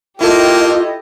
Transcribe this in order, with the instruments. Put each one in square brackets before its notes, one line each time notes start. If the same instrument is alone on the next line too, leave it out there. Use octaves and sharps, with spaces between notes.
[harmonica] A#3 [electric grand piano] E4 A4 [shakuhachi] F4 [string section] G4 D#5